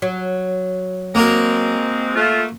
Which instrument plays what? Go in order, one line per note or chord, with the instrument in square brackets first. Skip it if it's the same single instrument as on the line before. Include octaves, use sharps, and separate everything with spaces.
[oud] F#3
[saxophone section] G#3 C4 [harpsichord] A#3 F#4 A#4
[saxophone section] A3 F4